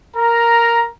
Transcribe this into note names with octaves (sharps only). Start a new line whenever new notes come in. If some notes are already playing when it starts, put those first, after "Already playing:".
A#4 A#5